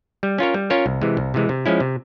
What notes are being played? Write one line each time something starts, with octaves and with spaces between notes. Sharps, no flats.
G3
C#4 F4 A#4 C#5
G3
C#4 F4 A#4 C#5
C2
C3 E3 G#3
C2
C3 E3 G#3
C3
F3 G#3 C#4 E4
C3